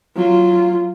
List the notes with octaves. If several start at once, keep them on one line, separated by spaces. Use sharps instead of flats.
F#3 F4